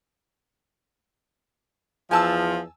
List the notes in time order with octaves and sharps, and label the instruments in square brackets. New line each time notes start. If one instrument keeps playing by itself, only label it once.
[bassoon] E2 [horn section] F3 [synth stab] G#5 A5 E6